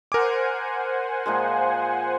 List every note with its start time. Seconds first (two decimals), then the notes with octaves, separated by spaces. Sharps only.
0.12 A#4 C5 F#5 G#5 D6
1.26 A#2 F3 G#3